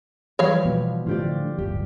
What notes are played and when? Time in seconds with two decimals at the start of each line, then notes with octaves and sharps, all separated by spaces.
0.39 E3 F3 G3 C#5 F5
0.65 B2
1.07 A2 D3 F3 F4 G4 D5
1.58 D1 G1 G4